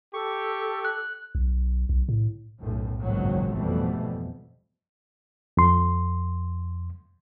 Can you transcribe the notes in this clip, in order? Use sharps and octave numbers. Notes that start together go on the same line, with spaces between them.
G4 A4 C#6
F#6
B1
B1
A2
B1 F#2 A2
G#1 C#2 F#2 A#2 D#3 F#3
F2 B2 E3 G3 A3
F2 C6